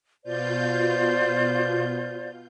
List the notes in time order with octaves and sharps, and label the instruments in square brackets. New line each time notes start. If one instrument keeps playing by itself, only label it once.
[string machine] B2 F4 G6 [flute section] C5 D5